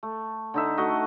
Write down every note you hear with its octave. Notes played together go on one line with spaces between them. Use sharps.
A3
D3 D#4 E5
A3 F#4 D#5 F#5